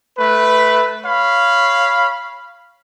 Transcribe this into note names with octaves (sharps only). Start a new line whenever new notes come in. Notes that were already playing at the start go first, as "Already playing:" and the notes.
A3 B4
C#5 F5 B5